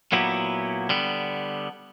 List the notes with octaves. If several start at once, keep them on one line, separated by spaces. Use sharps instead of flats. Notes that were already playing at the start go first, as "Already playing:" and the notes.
A#2 F#3 B3 E4 G4
D3 G3 B3